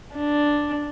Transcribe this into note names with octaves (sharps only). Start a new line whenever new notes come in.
D4